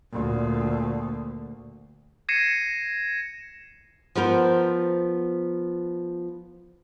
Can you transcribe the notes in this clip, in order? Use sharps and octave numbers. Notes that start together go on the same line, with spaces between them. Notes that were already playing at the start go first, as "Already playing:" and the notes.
D2 A#2
G#6 A#6 C7 C#7 D#7 E7
F3 B3 A#4 C5